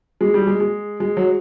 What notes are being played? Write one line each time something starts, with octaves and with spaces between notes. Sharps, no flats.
G#3
G3
G#3
G#3
G#3
F#3